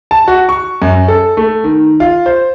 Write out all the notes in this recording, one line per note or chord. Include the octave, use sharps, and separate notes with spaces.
A5
F#4
C#6
F#2
A4
A3
D#3
F4
C5